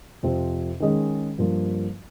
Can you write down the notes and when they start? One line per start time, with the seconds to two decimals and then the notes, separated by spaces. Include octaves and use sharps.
0.23 F2 C3 F3 C4
0.80 D#3 G#3 C#4 G#4 D#5
1.38 G2 F3 A#3